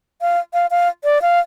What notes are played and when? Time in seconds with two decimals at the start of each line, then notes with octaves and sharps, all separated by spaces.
0.21 F5
0.54 F5
0.71 F5
1.04 D5
1.22 F5